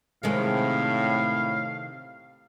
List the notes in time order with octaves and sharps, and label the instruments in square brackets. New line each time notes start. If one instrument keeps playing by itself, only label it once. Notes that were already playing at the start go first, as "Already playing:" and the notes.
[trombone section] A2 [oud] C3 D#3 G#3 [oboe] F5